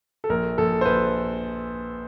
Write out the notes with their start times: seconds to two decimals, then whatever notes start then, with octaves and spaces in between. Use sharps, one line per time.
0.24 A4
0.29 A#1 A#4
0.58 A#1 A4
0.81 C5
0.85 A#1 B4